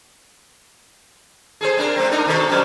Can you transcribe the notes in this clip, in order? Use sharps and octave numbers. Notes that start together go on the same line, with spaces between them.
G#4 A4 C5
C4 D4 A#4
G#3 C4
D4 D#4 A#4
B2 D#3 A4
F#2 B2 G3